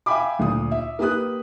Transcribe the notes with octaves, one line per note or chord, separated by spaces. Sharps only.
E5 F5 G5 G#5 B5 D6
D2 A#2 D#6
E5
A#3 G4 B4 D#6 F#6